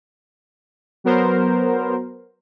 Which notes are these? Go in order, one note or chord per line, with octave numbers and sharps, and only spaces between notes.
F#3 B3 A#4 C5